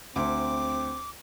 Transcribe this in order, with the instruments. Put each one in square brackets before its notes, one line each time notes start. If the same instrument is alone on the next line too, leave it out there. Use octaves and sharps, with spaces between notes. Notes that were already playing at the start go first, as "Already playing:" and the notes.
[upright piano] D2 [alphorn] C4 [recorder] D6